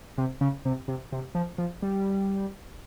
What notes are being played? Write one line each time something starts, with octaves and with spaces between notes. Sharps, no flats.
C3
C#3
C3
C3
C3
F3
F3
G3